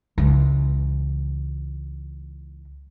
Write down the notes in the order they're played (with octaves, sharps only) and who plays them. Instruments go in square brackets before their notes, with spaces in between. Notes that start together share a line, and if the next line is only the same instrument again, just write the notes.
[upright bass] C#2 E3